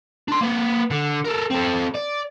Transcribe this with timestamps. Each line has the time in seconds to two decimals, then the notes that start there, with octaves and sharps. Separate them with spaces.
0.28 D4 C6
0.41 A#3 B4
0.91 D3
1.25 A4 A#4
1.51 C4 A4
1.95 D5